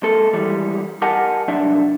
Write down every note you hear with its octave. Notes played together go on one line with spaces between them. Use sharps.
G#3 A#3 A4
D#2 E3 G3 G#3
G4 A#4 D#5 F#5 G#5 A5
C2 G#2 F#3 D4 D5 E5